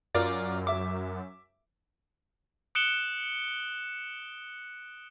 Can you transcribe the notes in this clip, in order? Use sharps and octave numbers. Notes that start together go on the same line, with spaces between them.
F#2 F4 A#4 D5
E5 D6
D#6 F#6 C#7 D7 E7 G7